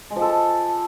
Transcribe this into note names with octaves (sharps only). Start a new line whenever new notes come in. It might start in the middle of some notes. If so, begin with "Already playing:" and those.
G#3
F3
A4